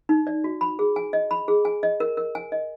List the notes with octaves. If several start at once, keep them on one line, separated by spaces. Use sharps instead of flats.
D#4
D5
F#4
B5
G#4
G#5
D#5
B5
G#4
G#5
D#5
A#4
A#4
G#5
D#5